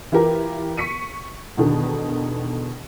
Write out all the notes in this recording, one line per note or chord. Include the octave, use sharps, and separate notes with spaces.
E3 E4 F4 G4 A#4
C#6 B6 C#7 D#7
E2 B2 D3 D#3